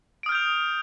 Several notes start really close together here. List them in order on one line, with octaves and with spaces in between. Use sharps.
D7 D#6 F6 G6 F7